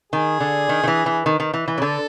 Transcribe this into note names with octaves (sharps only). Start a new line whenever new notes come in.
D#3 G#4
D3
D#3
D#3
E3
E3
D#3
D#3
E3
E3
C#3
D3 A4